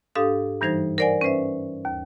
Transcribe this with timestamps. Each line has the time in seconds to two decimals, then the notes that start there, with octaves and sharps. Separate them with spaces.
0.15 G#2 D4 G4 A4 F5 D#6
0.61 G2 E3 G3 D#4 C5 G#6
0.98 A#4 C5 D5 F#5 G#5
1.21 C#4 B4 C5 E5
1.85 D#2